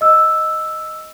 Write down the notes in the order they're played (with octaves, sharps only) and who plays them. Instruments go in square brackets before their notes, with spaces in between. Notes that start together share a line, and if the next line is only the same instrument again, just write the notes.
[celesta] D#5 E6